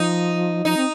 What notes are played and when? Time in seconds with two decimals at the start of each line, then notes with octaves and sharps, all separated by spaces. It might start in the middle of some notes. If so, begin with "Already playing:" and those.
Already playing: F3 D#4
0.65 F3 D#4
0.77 C4